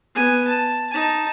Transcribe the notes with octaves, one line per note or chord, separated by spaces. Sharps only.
B3 G#5
A5
D#4 A5